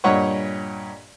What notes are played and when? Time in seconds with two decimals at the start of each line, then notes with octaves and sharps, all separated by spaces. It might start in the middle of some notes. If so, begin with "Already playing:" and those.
0.04 G2 A#2 C#5 D#5 F#5 C#6